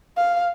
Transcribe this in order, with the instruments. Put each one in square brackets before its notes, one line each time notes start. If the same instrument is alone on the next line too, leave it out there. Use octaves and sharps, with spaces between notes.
[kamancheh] F5